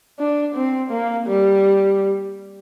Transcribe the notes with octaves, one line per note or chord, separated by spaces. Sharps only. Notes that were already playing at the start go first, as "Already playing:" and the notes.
D4
C4
A#3
G3